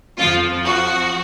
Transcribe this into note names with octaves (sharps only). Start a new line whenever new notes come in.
F2 F3 F4
F#4